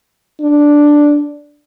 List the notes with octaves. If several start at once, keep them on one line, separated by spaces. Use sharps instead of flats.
D4